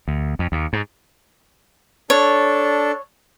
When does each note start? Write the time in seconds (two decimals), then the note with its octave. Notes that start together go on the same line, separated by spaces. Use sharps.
0.08 D2
0.39 F2
0.52 D#2
0.73 G#2
2.10 D4 A4 C#5